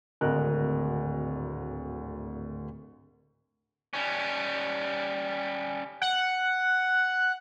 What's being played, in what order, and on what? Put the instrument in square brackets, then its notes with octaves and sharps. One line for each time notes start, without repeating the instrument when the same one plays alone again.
[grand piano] D1 G#1 D2 A#4 D#5 F#6
[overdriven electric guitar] G3 C#4
[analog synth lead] F#5